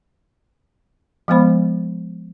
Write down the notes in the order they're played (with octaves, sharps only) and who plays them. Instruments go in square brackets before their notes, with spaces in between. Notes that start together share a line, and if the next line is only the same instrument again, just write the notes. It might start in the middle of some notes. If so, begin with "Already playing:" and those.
[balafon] F3 G#3 B3 C5 B5